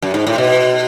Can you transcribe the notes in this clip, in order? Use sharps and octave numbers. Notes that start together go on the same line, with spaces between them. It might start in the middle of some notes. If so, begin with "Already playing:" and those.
F#2
G#2
A2
B2